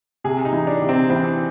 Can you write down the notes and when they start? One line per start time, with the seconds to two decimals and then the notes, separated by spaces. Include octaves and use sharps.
0.24 C3 G#4
0.45 D#4
0.53 E3
0.67 D4
0.81 C3
0.89 C4
1.10 E3 C4